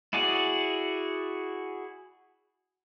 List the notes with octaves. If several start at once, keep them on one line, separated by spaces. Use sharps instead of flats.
E4 F#4 G#4 D5